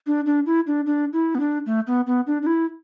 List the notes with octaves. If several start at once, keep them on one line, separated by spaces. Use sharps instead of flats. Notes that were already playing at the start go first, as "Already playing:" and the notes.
D4
D4
E4
D4
D4
E4
B3
D4
A3
B3
B3
D4
D4
E4